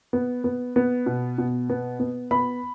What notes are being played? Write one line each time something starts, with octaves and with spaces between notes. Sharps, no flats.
B3
B3
B3
B2
B2
B3
B3
B3 B5